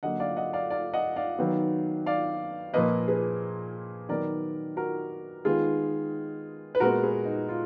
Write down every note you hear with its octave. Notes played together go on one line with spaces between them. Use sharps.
D3 F#3 A#3 D#5 F#5
D5 F5
D#5 F#5
D5 F5
D5 F5
D#5 F#5
D5 F5
D#3 F#3 B3
D5 F5
A#2 F3 A#3 B4 D#5
G#4 B4
D#3 F#3 B3 A#4 D5
F#4 A#4
D#3 G#3 B3 F4 G#4
B4
A#2 G#3 B3 F#4 A#4
G#4 B4
D#4
F4